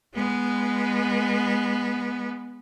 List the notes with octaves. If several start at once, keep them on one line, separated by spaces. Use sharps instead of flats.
G#3 B3